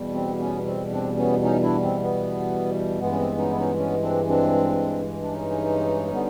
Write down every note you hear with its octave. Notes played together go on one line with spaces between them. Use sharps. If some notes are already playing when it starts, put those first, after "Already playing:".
Already playing: E2 B2 G3
C4
B3 C#4
C4
C4 D4
B3 C#4
C#4 D#4
D4 E4
C4
B3
G2 E3 G#3 B3
C#4
C4
C#4 D#4
E4
C#4 D#4
B3 C#4
C4 D4
C4 D4
D4
C#4 D#4
D3 G3 B3